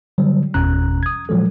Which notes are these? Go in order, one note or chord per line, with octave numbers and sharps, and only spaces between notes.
D3 F#3 G3
G1 E2 B2 C#4 A#5 F#6
D#6 G#6
A#2 F3 F#3 G#3 A4